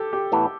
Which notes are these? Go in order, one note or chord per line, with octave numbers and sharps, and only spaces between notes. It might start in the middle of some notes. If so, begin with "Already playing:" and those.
Already playing: G4 A4
G4
A2 E3 B3 E4 A4